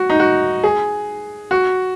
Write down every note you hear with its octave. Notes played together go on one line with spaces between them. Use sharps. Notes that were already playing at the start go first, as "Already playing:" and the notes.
Already playing: F#4
D#4
F#4
G#4
F#4